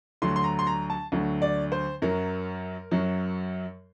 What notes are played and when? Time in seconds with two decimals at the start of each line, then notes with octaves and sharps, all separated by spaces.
0.22 D2 D3 F#3 C6
0.36 C6
0.44 A#5
0.59 C6
0.67 A#5
0.90 A5
1.12 D2 D3 F#3
1.42 D5
1.72 C5
2.02 F#2 F#3 A#4
2.91 F#2 F#3